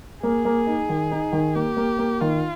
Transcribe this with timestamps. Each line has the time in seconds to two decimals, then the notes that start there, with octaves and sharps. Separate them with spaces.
0.23 A#3 G#4
0.45 A#3
0.67 D#4
0.89 D#3
1.11 D#4
1.32 D#3
1.55 A#3 G4
1.77 A#3
1.99 A#3
2.21 D#3 F4